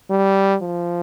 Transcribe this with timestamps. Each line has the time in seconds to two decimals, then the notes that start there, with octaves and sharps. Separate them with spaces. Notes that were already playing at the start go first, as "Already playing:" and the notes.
0.10 G3
0.62 F3